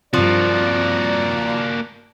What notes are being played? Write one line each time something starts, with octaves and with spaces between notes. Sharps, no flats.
G2 F3 A#3 C4 F#4 D5